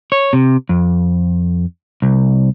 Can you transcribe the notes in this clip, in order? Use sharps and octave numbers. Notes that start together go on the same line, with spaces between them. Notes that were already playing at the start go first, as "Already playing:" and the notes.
C#5
C3
F2
C2